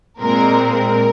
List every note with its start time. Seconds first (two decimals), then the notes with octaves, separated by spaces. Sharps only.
0.20 A#2 G#3 C4 A#4
0.73 A#4